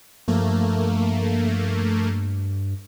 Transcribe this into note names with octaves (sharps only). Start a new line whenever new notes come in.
G2 F3 A3 A#3